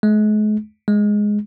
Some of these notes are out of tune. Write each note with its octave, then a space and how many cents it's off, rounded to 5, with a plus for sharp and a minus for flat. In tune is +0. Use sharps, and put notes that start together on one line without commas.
G#3 +40
G#3 +0